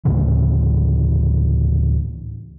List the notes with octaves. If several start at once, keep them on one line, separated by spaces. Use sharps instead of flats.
D2 A2 C#3 E3